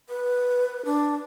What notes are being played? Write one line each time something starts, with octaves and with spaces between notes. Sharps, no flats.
B4
D4